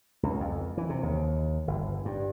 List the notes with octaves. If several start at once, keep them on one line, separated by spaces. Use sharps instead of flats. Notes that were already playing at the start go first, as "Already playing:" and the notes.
C#2
F2
E3
C3
D#2
G1
G2